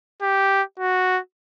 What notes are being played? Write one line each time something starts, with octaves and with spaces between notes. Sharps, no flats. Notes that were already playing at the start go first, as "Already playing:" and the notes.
G4
F#4